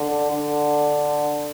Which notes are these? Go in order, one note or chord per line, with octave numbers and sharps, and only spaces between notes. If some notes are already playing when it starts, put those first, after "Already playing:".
Already playing: D3
D3